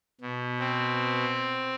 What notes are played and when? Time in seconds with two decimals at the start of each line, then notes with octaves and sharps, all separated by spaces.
0.21 B2
0.59 C4